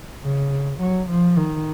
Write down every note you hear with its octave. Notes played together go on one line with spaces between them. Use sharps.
C#3
F#3
F3
D#3